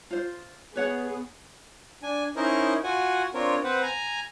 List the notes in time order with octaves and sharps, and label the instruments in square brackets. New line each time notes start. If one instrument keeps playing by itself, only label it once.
[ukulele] F4 C5
[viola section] B3 G#4 [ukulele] B4 C#5 F#5
[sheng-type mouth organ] D4 G#5
C#4 D#4 E4 A#4 C5 D#5
F4 F#4 F#5 G#5
C4 D4 F4 A#4 C#5
C4 B4 C5 F#5
G#5 A#5